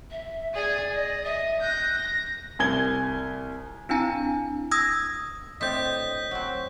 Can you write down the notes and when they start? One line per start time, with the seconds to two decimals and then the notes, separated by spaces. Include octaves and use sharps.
0.11 E5
0.55 G#4 D5 G#5
0.94 D#5
1.24 D#5 E5
1.61 F#6 G6 A#6
1.96 A#6
2.59 C2 G#5 G#6 G7
3.89 C4 D4 E4 G#5 A#5
4.71 D#6 E6 G#6 A#6
5.61 A2 C4 D4 D#5 G6 B6
6.31 F#3 C4